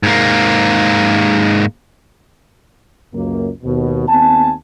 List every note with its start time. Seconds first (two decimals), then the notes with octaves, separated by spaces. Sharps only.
0.03 G#2 A#3
3.14 C#2 F#2 A#3
3.63 D#2 B2
4.08 D#2 B3 C4 G#5 A5